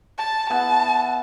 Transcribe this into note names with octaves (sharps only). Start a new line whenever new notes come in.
A5
B3 E4 F#5 A5